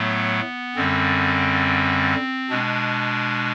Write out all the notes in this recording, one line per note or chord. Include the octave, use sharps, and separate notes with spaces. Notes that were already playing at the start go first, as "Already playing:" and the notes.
Already playing: A2 F#3 A3 B3
F#2 D3 G3 C4
B2 G#3 D4